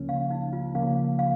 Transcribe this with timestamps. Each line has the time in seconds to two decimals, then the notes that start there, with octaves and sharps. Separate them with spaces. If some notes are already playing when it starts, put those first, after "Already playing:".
Already playing: C#2 C#3 F3 A#3 C#4
0.09 F5
0.31 D#4
0.53 F4
0.74 C#2 C#3 F3 A#3 C#4 F5
1.19 F5